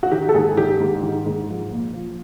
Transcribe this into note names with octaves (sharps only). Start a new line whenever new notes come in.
F#4
D#3 G4
A4
G#2 G#4
D#3 G4
G#2
D#3
G#2
F3
A#2
F3